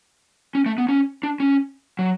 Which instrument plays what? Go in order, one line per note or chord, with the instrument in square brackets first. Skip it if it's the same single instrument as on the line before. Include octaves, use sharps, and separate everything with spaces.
[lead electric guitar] C#4
A3
B3
C#4
D4
C#4
F#3